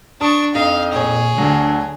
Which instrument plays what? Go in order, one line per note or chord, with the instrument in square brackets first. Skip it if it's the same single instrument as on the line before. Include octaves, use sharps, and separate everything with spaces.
[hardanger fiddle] D4 C#6 [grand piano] A5 D#6
[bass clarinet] F2 [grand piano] D#4 D#5 [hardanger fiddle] F5
[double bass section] A#2 [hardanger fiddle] G#4 C#5
[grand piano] D2 F#3 [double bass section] D3 [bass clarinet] D4